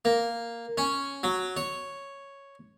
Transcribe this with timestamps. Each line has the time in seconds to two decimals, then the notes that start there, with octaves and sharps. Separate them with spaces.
0.05 A#3
0.78 C#4
1.23 F#3
1.57 C#5